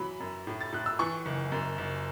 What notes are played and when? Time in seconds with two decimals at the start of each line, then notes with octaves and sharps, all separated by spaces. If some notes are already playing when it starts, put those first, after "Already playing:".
Already playing: E3 F#3 B5
0.20 F#2
0.47 A2
0.61 A6
0.73 A2 F#6
0.86 E6
0.99 E3 C#6
1.26 F#1
1.52 F#2
1.78 F#1